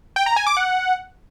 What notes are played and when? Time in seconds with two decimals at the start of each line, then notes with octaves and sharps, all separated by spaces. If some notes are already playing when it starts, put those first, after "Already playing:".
0.16 G5
0.26 A#5
0.36 G#5
0.47 D6
0.57 F#5